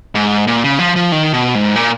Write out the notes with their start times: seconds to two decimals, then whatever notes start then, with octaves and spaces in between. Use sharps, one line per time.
0.15 G#2
0.47 A#2
0.64 C#3
0.79 F3
0.96 F3
1.12 D#3
1.33 B2
1.55 G#2
1.76 A#2